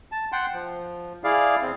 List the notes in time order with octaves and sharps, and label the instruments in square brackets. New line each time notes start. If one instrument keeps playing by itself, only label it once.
[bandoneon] A5
F#5 G5 C6
F3
E4 G#4 D5 F5
E2 C4